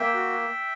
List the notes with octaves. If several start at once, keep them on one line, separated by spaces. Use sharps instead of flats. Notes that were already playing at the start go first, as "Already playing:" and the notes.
Already playing: A#3 E5 G5
F#4